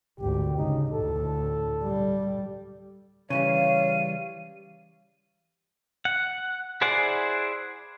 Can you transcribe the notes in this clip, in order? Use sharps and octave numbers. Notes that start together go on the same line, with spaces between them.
G#1 D2 G4
G#1 C#3 D#4
D2 A2 A4
G3
C#3 E3 G3 C#5 F5 D#7
F#5
E4 G#4 C5 D5 F#5